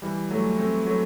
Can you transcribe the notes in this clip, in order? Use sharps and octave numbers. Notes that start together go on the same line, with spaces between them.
E3 G3
F#3 A3
A3 C4
F#3 A3